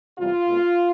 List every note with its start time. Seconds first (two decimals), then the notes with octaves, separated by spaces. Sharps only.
0.18 E2 C3 G3 F4
0.47 B2 A3 C4